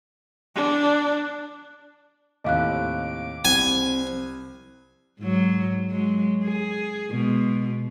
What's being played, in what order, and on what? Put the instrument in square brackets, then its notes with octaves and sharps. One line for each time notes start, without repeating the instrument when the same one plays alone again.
[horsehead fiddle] D4
[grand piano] D#2 A2 C3 [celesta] D#5 F5 F#6 [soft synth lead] D6
[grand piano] C2 [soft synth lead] C4 [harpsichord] G#5
[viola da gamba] G#2 F#3
F#3 G#3
G#4
B2 G#3